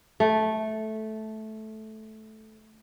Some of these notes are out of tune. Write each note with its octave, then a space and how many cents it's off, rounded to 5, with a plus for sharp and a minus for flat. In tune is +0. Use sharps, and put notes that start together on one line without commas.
A3 -10